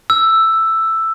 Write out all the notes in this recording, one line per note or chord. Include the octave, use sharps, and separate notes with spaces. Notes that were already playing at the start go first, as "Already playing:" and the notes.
E6